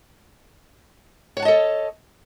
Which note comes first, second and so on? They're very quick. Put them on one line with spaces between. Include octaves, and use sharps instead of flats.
C#5 F#5 A5 D#5 A4